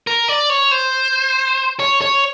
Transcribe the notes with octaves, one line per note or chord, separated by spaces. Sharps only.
A#4
D5
C#5
C5
C#5
C#5